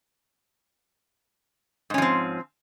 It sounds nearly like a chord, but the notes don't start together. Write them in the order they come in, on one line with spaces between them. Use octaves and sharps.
G#2 C#4 F3 C4